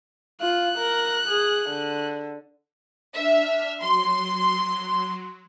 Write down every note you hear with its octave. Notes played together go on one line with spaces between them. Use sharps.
F4 F#6
A#4
G#4
D3
D4 E5 F6
F#3 C6